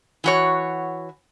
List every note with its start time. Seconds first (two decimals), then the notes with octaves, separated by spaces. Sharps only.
0.24 E3 F#4 C#5